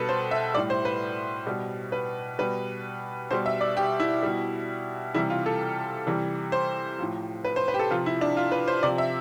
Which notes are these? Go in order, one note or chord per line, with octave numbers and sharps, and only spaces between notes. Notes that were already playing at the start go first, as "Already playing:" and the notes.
Already playing: B2 G3 A4 B4
C5
E5
A2 G3 D5
C5
B4
B2 G3
B4
B2 G3 B4
B2 G3 C5
E5
D5
G4
E4
B2 G3
C3 E3 G3 E4
F4
A4
C3 E3 G3
C5
A2 F3
B4
C5
B4
G4
A4
C3 F3 F4
E4
D4
F4
B4
C5
C3 F3 D5
E5